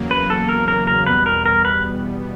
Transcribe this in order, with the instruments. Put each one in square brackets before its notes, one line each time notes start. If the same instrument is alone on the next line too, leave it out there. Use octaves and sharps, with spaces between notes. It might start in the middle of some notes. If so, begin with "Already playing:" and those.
Already playing: [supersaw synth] E2 C#3 F#3 A#3
[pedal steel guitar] B4
A4
A#4
A#4
A#4
[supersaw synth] E2 B2 G3 B3 [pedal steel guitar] B4
[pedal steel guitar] A#4
A#4
B4